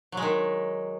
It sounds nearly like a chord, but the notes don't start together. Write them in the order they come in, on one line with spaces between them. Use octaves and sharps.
F#3 G#3 D#3